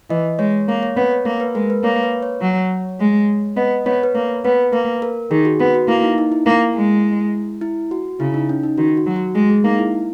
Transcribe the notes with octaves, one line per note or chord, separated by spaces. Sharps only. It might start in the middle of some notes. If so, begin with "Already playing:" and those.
E3 D#5
G#3 C#5
A#3 C#5
C#5
B3 C#5
C#5
A#3 A#4
B4
G#3 A#4
B4
A#3 C#5
B4
C#5
F#3
G#3
B3 D#5
B3 C#5
B4
A#3 C#5
B3 B4
A#3 B4
A#4
D#3 G#4
F#4
B3 F#4
F#4
A#3 E4
D#4
D#4
E4
A#3
G#3
E4
F#4
C#3 E4
D#4
C#4
D#4
D#3 F#4
F#4
F#3
F#4
G#3 G#4
G#4
A#3 D#4
E4